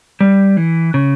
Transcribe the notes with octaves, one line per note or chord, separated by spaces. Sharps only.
G3
E3
C#3